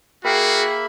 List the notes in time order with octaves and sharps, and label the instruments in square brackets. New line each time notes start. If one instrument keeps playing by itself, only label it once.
[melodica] A#3 E5 B5 [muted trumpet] F#4 [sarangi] G#4 [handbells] A#4 G5 C7